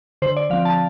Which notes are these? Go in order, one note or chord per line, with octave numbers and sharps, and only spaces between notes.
D3 C5
D5
F3 C4 F5
A5